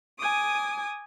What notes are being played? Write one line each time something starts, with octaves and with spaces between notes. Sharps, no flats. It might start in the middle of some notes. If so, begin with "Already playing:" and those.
G#5 D6 D#6